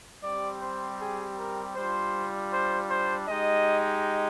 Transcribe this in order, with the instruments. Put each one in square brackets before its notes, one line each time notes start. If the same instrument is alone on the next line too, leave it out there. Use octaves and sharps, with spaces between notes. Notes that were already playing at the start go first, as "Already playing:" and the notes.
[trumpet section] G3 C4 G4 D5
C5
G#4
A#4
G3 D4 F4 C5
C5
C5
G#3 D#4 G4 D#5